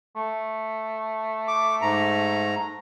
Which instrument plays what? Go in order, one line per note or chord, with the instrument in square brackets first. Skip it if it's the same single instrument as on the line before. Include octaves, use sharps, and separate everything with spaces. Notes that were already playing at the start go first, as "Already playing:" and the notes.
[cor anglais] A3
[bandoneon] D6
G#2 A#5